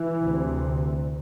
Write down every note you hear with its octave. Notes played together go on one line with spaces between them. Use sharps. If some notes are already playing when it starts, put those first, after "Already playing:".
Already playing: E3
D2 C3